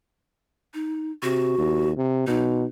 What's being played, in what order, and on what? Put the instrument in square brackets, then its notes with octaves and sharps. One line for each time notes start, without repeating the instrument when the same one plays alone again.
[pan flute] D#4
[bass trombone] C3 [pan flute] F#4
[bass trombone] D#2
C3
[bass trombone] B2 [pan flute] D#4